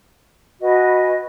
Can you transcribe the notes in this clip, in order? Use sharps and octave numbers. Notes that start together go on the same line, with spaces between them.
F#4 B4 D#5 G#5